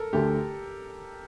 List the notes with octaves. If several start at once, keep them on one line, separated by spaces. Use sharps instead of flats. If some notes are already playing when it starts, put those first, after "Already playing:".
Already playing: A4 A#4
D2 D3 A3 G4